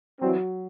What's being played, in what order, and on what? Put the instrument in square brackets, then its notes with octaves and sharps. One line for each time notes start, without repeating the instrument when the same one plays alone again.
[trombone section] E3 G3 C4 [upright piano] F#3